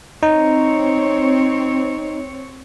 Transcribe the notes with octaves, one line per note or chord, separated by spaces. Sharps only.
C4 D#4 C#5